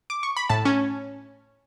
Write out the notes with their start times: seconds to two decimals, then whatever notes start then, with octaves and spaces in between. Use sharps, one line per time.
0.10 D6
0.23 C#6
0.37 B5
0.49 A2 A5
0.65 C#4